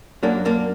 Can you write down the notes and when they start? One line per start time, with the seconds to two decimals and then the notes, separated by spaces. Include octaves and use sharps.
0.23 F#2 F#3 A#3 D4
0.45 A#3 D4